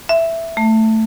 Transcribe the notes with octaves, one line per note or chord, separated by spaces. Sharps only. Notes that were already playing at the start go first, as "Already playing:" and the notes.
E5
A3